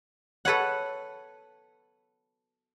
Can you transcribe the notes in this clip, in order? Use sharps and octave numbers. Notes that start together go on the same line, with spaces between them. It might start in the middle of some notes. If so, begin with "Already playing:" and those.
A4 B4 C#5 F#5